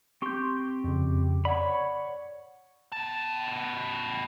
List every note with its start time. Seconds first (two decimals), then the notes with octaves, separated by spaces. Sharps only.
0.22 C4 G4 C6 C#6 G6
0.84 F2 C#3
1.45 C#5 D5 F#5 B5
2.92 B3 A5